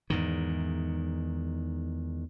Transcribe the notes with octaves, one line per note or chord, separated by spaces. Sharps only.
E2 G#2 D#3